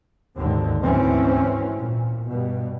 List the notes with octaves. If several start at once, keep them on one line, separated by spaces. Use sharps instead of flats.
G#1 D#2 D3 C4
D2 G#2 E3 C4 C#4
A#2
G2 B2